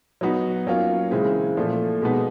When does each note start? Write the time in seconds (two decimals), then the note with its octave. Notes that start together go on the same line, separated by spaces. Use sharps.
0.21 F#3 B3 D#4 F#4
0.67 F#3 A#3 C#4 F4
1.11 C#3 E3 G#3 C4
1.57 A#2 F3 A3
2.02 B2 G#3 B3 D#4